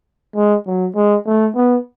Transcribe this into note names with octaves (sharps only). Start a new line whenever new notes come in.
G#3
F#3
G#3
A3
B3